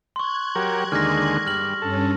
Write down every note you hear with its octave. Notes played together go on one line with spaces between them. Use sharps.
C6 C#6 F#6 G#6
F#3 G4 A#4
D#2 D3 G#3 F6 A#6
G2 F6 F#7
G2 C#4 A4